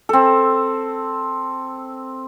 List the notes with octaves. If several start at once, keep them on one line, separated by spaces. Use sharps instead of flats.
C4 A4